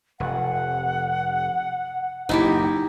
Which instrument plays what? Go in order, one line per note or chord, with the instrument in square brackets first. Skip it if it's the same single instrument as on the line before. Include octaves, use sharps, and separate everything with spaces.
[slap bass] F1 [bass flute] F#5
[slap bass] F#1 D#2 A#2 [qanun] D#4 E4 G4